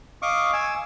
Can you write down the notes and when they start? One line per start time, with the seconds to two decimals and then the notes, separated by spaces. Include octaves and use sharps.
0.22 D#5 F5 C#6 D6
0.53 G#5 E6